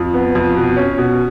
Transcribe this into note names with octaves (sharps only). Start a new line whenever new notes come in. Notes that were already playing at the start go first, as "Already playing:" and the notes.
Already playing: F2
B3
F2
B2
C#4
B2